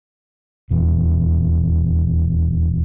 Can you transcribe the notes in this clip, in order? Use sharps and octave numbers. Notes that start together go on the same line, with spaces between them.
D#1 E2